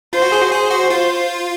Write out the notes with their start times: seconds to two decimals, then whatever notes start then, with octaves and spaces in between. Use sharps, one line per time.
0.13 F4 C5
0.22 F#4
0.32 G#4
0.42 F#4
0.51 G#4 C5
0.71 F#4
0.90 F4